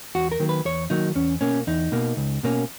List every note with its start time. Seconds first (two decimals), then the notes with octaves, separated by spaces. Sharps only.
0.15 E2 F#4
0.32 A#4
0.40 D#3 F#3 A#3
0.49 B4
0.65 E2 C#5
0.90 D#3 F#3 A#3 D#4
1.15 E2 C#4
1.41 B2 A#3 C#4
1.67 E2 D#4
1.92 B2 A#3
2.17 C#2
2.43 B2 A#3 C#4